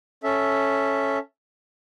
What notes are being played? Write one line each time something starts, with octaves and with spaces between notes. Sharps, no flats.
C#4 A4 E5